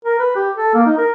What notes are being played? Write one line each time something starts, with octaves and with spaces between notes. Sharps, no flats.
A#4
B4
G4
A4
A#3
D#4
A#4